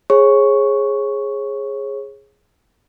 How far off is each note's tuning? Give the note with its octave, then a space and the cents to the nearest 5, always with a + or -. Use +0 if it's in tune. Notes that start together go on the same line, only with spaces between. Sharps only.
G#4 +0 C#5 -35 C#6 +0